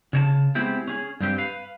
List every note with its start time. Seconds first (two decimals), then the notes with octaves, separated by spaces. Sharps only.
0.13 C#3 C#5 A5
0.55 G#3 B3 C4 E4 G4
0.88 C#4 G#4
1.20 G2 C4 G4
1.38 B4 F5